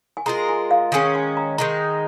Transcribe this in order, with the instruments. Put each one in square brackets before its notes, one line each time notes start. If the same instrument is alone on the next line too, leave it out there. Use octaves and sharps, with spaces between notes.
[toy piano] G#5
[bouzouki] G#3 F4 A#4 [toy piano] A#5
[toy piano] G#5
F5
[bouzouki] D#3 G#3 C#4 [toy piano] G#5
[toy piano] G#5
A#5
[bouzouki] D#3 G#3 D#4 [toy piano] A#5